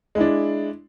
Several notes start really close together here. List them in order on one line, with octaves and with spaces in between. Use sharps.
G#3 E4 D4